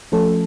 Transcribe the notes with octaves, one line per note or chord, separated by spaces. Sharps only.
F3 A3 C#4 A4